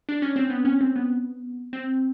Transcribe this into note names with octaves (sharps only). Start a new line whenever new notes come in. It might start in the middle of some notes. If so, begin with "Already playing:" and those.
D4
C#4
C4
B3
C#4
C4
B3
C4